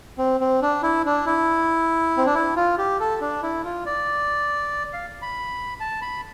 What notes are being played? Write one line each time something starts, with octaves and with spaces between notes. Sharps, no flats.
C4
C4
D4
E4
D4
E4
C4
D4
E4
F4
G4
A4
D4
E4
F4
D5
F5
B5
A5
B5